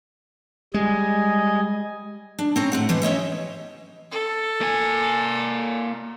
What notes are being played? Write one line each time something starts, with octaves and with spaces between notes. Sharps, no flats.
G3 G#3 D#5 G#5
D4
C4 C#4 A#5
A2 C4 F#5
E3 G#3 B3
C#4 C#5 D#5 E5
A4
A#3 G#5